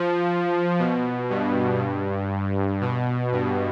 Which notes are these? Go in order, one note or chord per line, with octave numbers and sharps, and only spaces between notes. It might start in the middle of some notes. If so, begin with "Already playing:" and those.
Already playing: F3
B2
G2
B2
G2